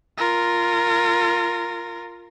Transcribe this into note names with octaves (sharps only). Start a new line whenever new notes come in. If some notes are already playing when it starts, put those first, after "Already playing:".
F4 A#4